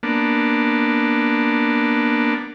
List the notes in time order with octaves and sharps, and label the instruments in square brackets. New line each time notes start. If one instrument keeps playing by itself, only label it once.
[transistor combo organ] A#3 B3 D4